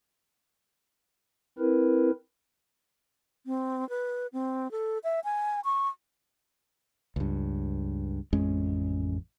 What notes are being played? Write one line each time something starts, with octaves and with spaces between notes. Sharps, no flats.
C4 E4 A#4 B4
C4
B4
C4
A4
E5
G#5
C#6
C#2 G2
A1 F2 G#3 C#4